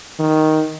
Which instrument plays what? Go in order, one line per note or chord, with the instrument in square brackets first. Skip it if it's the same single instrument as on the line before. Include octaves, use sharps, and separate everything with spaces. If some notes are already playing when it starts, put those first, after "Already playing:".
[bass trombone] D#3